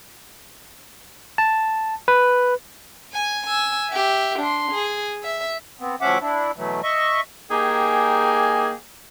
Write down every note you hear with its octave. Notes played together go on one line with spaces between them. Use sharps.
A5
B4
G#5
G#5 E6
G4 E5
D4 C6
G#4
E5
B3 C4
D2 F3 C#4 E5 F#5 D6
D4 E4
B2 E3 F#3 A3
D#5 E5 C#6
A#3 D#4 G4 G#4 G5 G#5